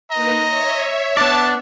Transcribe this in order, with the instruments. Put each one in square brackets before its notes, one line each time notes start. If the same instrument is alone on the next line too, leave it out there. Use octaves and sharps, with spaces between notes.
[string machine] A#3 D#4 B4 [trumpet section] C5 D#5 [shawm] A#5
[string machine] C#5 E5
[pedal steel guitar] B3 D5 [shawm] D4 [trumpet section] A5